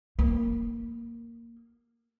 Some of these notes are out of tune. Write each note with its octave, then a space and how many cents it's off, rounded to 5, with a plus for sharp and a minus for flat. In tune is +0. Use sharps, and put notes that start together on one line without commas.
A#3 -5